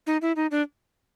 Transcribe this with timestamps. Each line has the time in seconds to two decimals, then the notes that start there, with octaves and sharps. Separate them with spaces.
0.07 D#4
0.22 E4
0.36 D#4
0.51 D4